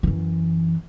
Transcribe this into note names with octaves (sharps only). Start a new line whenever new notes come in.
F#2 E3